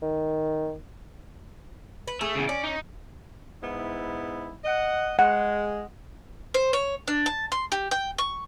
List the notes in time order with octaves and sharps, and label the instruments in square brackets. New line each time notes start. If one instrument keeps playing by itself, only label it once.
[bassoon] D#3
[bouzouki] B4
[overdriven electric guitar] A3 [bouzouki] G#4
[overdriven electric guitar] E2 C#3
[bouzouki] C#4 [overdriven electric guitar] D5
[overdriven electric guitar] D#4
[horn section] G#2 B3 E4
D#5 F#5
[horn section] G#3 [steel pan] F#5
[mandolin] C5
C#5
D4
A5
C6
G4
G5
C#6